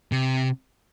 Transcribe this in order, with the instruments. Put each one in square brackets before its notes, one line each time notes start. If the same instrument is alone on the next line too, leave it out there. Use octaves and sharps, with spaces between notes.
[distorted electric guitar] C3